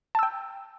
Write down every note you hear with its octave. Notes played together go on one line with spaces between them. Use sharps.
G5 A5 E6